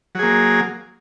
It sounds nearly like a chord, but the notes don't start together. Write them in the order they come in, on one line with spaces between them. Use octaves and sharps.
F#3 G#4 A#3